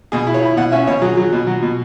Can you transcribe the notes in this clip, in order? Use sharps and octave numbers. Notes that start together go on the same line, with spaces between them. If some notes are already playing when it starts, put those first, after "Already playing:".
B2 G#4
E4
C#5
E4
B2 F#5
C#4 E5
B2 C#5
F#3 G#4
F#3
B2
F#3
B2